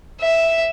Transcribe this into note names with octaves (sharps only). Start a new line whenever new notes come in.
E5